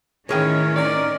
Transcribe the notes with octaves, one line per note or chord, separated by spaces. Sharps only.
A2 D#3 E3 C#4 G#4 A#4 C#5 G5
D#4 A#4 D5